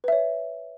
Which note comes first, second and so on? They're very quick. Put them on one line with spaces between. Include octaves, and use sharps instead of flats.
B4 E5 C#5